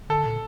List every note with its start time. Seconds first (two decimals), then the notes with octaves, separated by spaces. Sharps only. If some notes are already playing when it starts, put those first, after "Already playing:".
0.09 D3 A4
0.26 A#2